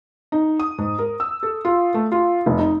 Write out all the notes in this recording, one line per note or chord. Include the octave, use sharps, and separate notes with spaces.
D#4
D#6
G#2
A#4
E6
A4
F4
A3
F4
F1
D#4